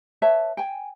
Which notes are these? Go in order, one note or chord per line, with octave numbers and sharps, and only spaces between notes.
B4 C#5 E5 A5
G5 G#5